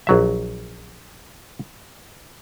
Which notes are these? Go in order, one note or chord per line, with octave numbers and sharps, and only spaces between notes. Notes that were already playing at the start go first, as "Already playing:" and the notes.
A#1 F#3 E5